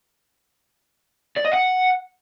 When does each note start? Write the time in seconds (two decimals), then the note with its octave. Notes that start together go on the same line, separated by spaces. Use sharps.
1.36 D5
1.45 D#5
1.53 F#5